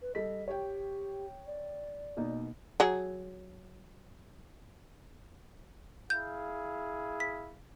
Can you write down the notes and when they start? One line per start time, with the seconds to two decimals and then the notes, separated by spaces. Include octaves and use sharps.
0.02 B4
0.15 G3 A4 D#5 B6
0.48 G4 C#5 G5
1.47 D5
2.17 B2 A#3 D#4
2.80 F#3 G#4
6.10 E4 G#4 F5 G6
7.20 B6